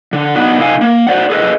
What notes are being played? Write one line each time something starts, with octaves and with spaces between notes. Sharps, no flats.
D3
B3 D4 D#4 F#4
C3 D#4 A4 F5 G#5
A#3
F#4 C5 D5 F#5
G#4 A4 B4 D#5